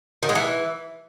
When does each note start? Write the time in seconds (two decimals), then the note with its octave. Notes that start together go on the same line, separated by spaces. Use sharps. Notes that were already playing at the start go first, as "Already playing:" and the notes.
0.23 D#3
0.29 G#3
0.35 E3